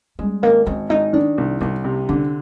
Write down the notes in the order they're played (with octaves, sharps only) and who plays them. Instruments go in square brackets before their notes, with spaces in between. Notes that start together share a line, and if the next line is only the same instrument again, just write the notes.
[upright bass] G3 [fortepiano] G#3
[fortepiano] G#1 [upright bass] A#3
[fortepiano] G#1 [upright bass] C4
[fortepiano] G#1 [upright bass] D#4
[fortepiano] D#3 [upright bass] D4
[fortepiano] C2
[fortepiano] C2 [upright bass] D4
[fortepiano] C3
[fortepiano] D3 [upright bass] D4